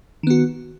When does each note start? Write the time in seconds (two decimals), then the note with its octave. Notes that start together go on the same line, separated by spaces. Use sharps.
0.23 D#3
0.27 B3
0.30 F#4